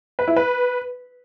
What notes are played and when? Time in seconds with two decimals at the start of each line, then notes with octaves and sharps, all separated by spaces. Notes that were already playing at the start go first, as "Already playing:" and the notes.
0.19 B4
0.28 E4
0.36 B4